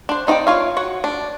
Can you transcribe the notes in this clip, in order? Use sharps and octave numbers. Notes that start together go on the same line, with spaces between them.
D4 C5
C4 D#4 F4 D5 G5
F4 C#5 F5
F#4 C#5
D4